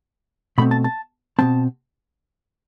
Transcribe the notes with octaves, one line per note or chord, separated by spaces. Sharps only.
B2 A3 C4 B5
A5
A5
B2 A3 C4 A5